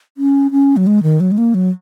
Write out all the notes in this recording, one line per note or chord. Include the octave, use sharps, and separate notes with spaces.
C#4
C#4
F#3
G#3
D#3
F#3
G#3
A#3
F#3